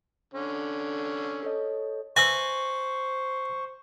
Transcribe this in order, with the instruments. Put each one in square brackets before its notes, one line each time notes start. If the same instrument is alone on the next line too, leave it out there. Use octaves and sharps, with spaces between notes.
[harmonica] D3 C#4
[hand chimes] A4 C#5 D#5
[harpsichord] B4 G#5 [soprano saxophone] C5 [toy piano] E5 E6 [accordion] C#6